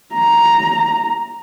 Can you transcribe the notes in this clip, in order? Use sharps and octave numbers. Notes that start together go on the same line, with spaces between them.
A#5